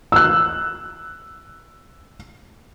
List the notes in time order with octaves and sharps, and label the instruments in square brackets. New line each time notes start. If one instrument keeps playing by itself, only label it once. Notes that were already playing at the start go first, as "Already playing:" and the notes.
[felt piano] E6 F#6